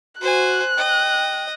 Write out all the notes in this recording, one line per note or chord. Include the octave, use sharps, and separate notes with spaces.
F#4 C5 G#5 F#6
D#5 G5